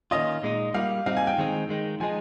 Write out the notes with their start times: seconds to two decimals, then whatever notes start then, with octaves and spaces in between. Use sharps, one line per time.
0.11 D#3 A#3 C#4 F4 D#5
0.43 A#2 G#3 D#4
0.74 G3 A#3 F4 F5
1.06 G3 C4 D#4 F5
1.17 G#5
1.27 G5
1.38 D#3 G#3 C4 D#4
1.69 D#3 G#3 D#4
2.00 F3 G#3 D#4 G#5